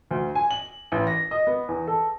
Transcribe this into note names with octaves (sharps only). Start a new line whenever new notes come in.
D2
G#5
F#7
A1
A#6
D#5
B3
E2
A4